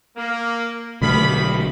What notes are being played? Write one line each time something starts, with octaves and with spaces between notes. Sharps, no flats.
A#3
B1 D3 D#3 G3 A3 B5